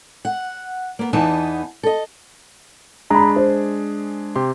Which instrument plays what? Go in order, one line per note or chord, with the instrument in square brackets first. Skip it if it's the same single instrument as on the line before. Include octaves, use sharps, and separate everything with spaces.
[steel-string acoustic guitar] F#5
A#3 B3
E2 E3 B3 D#4 A5
A4 D#5
[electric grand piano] G#3 D4 G#4 [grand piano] A#5 B5
[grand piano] C5
[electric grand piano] C3 G4 C6